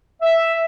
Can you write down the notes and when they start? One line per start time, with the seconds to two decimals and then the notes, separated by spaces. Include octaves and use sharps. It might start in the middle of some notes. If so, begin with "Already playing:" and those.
0.22 E5